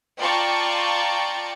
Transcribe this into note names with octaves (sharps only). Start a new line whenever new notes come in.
F4 D5 G5 A5 A#5 C#6